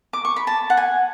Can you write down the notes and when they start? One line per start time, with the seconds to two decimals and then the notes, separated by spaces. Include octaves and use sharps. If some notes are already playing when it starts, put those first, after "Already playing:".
0.13 D6
0.25 C#6
0.36 B5
0.47 A5
0.70 F#5
0.77 G#5